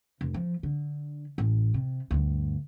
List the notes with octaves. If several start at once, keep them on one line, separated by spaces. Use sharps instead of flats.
F1
F3
D3
A1
C3
D2 G2